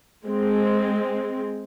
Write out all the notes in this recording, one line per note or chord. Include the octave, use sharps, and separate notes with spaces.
G#3 C4